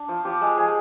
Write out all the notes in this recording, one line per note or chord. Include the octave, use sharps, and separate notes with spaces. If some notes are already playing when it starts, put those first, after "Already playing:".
Already playing: D4
F3
F3 G4
G#3
F3 G#4